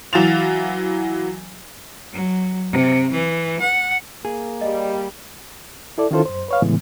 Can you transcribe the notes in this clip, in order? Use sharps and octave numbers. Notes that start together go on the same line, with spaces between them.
E3 F#3 F5 A6 E7 F7
F#3
C3
E3
F#5
A#3 G#4
G3 D#5
E4 A4 D5
D#3 C#4 E4 F4 A4 C5
F#2 C5
B4 C#5 F5
A2 C#3 E3 G#3 B3